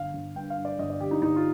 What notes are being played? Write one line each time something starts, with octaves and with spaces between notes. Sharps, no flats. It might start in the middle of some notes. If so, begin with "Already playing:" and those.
Already playing: G1 F5
G1
G2 G5
F5
G2
D5
G1 D#5
D5
G1 G4
D#4
G1 D#4
F4